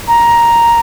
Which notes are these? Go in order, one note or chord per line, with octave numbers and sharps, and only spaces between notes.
A#5